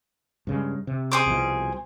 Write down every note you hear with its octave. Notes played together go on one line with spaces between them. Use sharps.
G2 C#3 G#3
C3
G#4 C5 D6
C2 B2 F3